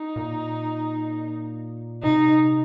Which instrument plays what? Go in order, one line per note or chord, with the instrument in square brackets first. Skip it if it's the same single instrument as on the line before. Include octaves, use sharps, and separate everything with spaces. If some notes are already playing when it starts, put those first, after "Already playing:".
Already playing: [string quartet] D#4
[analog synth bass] A#2
[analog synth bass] C3 [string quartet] D#4